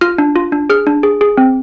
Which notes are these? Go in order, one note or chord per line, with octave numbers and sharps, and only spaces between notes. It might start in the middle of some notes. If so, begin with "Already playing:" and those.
F4 F6
D4
F4
D4
G#4 F6
D4
G#4
G#4
C4